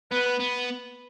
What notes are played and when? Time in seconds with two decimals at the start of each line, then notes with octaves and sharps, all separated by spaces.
0.11 B3 B4
0.40 B3